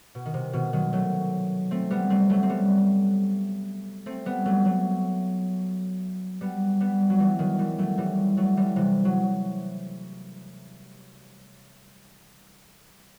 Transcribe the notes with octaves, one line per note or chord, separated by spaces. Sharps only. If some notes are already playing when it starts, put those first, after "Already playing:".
B2
D#3
C3
B2 D#3
D#3 F#3
F#3 A3
A3 C4
G3 B3
A3 C4
F#3 A3
C4
G3 B3
A3 C4
G3 B3
F#3 A3
F#3 A3
G3 B3
G3 B3
F#3
E3 G3
D#3 F#3
E3 G3
F#3 A3
E3 G3
F#3 A3
E3 G3
C3 E3
F#3